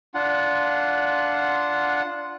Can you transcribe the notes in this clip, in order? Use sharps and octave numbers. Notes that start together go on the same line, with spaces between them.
D4 F4 F#5